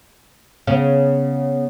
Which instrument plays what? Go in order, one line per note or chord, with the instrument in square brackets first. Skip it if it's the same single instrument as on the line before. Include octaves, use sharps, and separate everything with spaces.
[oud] C#3 [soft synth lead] B3